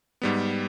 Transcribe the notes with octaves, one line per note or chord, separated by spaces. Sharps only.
G#2 G3 B3